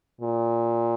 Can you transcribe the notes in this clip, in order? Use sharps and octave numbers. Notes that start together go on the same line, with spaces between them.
A#2